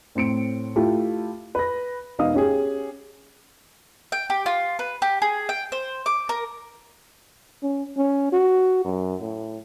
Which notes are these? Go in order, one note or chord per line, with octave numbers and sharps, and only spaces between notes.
A2 C4 C#7 D7
A3 E4 F4 G4
B4 A#6
E1 B3 D#4 F5 D#6
C#4 G4 G#4
G5
G4
F4
B4
G4
G#4
G5
C5
D6
A#4
C#4
C#4
F#4
F#2
A2